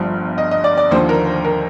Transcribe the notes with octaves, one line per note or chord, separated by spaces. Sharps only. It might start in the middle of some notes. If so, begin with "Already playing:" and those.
Already playing: G1 G2 F3
D#5
D#5
D5
D5
D#2 D3 F3 C5
A#4
C5
A#4